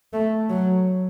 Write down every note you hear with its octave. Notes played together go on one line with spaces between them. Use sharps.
A3
F#3